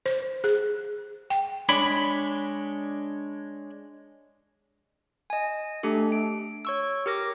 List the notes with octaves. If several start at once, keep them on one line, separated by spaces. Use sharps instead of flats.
C5
G#4
G5
G#3 D4 C#5 B5
D#5 G#5
A3 D4 G4 A4
D7
C#5 C#6 E6
G4 A#4 D6 A#6